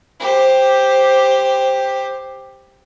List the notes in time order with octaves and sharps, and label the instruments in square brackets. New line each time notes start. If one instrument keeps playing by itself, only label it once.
[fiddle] G4 C5